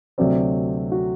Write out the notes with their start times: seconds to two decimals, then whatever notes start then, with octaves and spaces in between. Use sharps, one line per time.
0.18 D2 C3 F#3 C4 D5
0.92 F#4